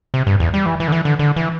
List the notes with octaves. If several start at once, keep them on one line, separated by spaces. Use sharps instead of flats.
C3
G2
E2
G3
E3
E3
D3
E3
D3
D3
E3